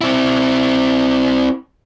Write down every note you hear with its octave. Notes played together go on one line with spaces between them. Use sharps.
C4 E4